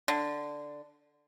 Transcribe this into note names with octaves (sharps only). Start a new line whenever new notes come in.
D3